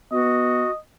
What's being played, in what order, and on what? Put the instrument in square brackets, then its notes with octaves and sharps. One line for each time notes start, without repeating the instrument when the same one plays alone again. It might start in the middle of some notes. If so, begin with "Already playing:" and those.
[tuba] B3 [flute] F#4 [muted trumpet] D#5